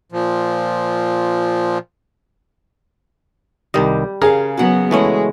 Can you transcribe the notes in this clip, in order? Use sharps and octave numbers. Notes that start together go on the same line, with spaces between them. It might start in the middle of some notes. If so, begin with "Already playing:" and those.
A#2 F3
C2 D#3 G3 G4 D#5
C#3 G#4 A#4 F5
F#3 B3 F#4 F#5
E3 G#3 A3 C#4 E4 F#5 G#5